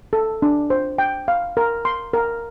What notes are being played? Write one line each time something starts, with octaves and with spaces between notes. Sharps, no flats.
A4
D4
C5
G5
F5
A#4
C6
A#4